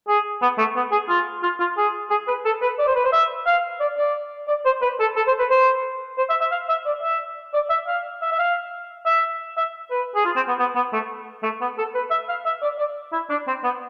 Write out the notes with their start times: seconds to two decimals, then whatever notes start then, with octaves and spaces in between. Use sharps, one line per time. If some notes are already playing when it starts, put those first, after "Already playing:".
0.08 G#4
0.42 B3
0.58 A3
0.76 B3
0.92 G#4
1.09 F4
1.43 F4
1.60 F4
1.77 G#4
2.10 G#4
2.28 B4
2.45 A4
2.62 B4
2.79 D5
2.87 C5
2.96 B4
3.05 C5
3.13 E5
3.47 F5
3.80 D5
3.97 D5
4.48 D5
4.65 C5
4.82 B4
5.00 A4
5.16 A4
5.27 C5
5.39 B4
5.50 C5
6.18 C5
6.30 E5
6.41 E5
6.52 F5
6.69 E5
6.86 D5
7.03 E5
7.54 D5
7.70 E5
7.88 F5
8.22 E5
8.32 E5
8.39 F5
9.06 E5
9.57 E5
9.91 B4
10.15 G#4
10.25 F4
10.36 C4
10.48 B3
10.59 B3
10.75 B3
10.93 A3
11.43 A3
11.61 B3
11.78 A4
11.95 B4
12.11 E5
12.29 F5
12.46 E5
12.62 D5
12.79 D5
13.13 E4
13.30 D4
13.48 C4
13.64 B3